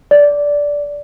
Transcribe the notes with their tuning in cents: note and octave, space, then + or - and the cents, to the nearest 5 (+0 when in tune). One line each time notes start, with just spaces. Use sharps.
D5 -10